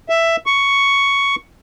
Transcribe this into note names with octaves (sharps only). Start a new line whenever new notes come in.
E5
C#6